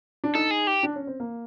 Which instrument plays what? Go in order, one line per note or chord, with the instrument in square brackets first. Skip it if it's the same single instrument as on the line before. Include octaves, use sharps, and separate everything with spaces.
[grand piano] D4
[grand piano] D#4 [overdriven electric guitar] A4
[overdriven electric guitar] G#4
G4
[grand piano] D4
C#4
C4
A#3